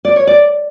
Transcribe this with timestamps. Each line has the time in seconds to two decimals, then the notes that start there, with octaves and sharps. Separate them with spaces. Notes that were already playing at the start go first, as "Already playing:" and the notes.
0.05 D5
0.16 C#5
0.27 D5